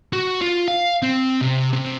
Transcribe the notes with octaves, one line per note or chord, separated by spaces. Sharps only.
F#4
F4
F5
C4
C3
C3